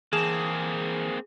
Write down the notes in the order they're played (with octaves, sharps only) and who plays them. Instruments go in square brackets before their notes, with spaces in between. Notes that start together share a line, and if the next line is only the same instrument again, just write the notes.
[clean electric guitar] E3 A5 [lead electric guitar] A#3 C4 [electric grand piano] G#4